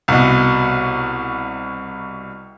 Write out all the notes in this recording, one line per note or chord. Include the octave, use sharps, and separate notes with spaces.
C2 B2